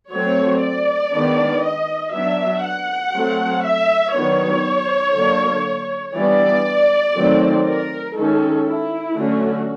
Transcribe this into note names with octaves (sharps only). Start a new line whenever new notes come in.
F#3 A3 C4 C#5
D5
D#3 G#3 B3 D4
D#5
F#3 B3 D4 E5
F#5
F#3 A3 C4
E5
D#3 F#3 B3 D4 C#5
D3 F#3 A#3 D4
E3 G3 B3 D4 D5
D#3 F#3 A3 C4
A#4
D#3 G#3 C#4 A4
E4
D3 F#3 A3 C#4 F#4